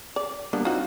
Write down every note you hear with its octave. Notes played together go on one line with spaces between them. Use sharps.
D5
G3 A#3 B3 D4
C4 D#4 F4 F#4